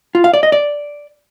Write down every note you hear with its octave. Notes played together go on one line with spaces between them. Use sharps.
F4
F5
D5
D#5
D5